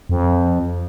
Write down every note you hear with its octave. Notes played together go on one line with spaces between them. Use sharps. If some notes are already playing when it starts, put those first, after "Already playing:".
F2